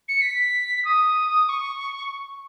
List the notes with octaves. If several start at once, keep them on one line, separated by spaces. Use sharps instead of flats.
C#7
B6
D#6
C#6